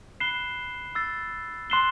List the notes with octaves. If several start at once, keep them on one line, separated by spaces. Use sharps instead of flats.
B5 F#6 C7 E7 G7
E6 A6 C7
C6 F#6 C7 E7 G7